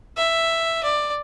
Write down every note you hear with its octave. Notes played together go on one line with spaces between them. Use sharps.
E5
D5